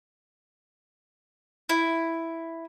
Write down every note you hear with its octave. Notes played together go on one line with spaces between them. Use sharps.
E4